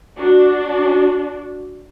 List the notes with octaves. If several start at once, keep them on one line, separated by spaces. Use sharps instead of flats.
D4 F#4